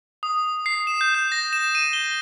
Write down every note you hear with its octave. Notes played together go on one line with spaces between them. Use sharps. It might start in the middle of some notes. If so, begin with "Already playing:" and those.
D#6
C7
E7
G6
G6
A#6
E7
D#7
G7